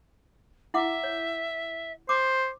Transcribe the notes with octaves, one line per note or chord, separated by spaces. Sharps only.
E4 E5 F#5 D6
C#5
C5 D6